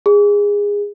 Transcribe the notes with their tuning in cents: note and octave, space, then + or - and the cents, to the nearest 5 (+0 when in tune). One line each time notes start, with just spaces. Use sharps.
G#4 -20